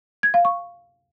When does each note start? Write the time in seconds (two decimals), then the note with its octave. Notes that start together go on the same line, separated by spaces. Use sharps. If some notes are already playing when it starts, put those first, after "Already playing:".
0.23 G#6
0.34 F5
0.45 C#6